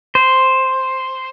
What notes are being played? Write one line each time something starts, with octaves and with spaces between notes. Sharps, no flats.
C5